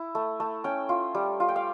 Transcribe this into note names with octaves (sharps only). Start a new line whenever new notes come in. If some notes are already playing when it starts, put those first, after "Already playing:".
Already playing: E4
A3
A3
C#4 G5
F4
G3
F4
G5
F5